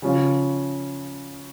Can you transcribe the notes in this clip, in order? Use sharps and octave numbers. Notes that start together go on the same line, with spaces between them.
C#3 F3 C#4 F4